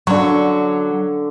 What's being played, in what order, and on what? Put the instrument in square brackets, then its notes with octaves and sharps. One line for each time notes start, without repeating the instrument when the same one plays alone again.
[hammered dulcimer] D3 C#6 [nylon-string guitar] F#3